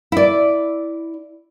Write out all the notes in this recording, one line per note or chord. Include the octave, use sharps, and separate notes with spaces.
E4 D5